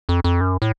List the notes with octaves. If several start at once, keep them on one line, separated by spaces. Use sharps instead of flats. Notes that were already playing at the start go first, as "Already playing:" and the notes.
F2
F2
F#2
A2